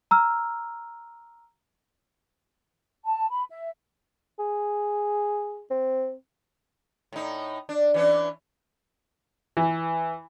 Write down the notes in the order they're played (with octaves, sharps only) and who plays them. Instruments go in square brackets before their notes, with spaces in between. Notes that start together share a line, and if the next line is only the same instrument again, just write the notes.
[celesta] A#5 E6 F6
[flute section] A5
B5
E5
[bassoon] G#4
C4
[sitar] A2 D#4
D4
E3 C#4 D4
[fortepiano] E3